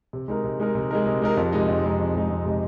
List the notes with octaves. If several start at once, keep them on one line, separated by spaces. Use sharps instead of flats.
C3
G#3 D#4 A#4
C3
G#3 D#4 A#4
C3
G#3 D#4 A#4
C3
G#3 D#4 A#4
F2
C3 G#3 D#4
F2
C3 G#3 D#4
F2
C3 G#3 D#4
F2
C3 G#3 D#4